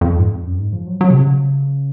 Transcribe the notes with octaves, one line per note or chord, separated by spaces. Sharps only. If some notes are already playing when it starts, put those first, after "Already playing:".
F2
G#2
F2
F#2
G#2
F3
F#3
F#3
C3
C#3